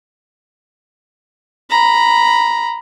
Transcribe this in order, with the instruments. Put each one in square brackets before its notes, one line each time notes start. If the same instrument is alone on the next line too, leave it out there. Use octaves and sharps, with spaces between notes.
[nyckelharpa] A#5 B5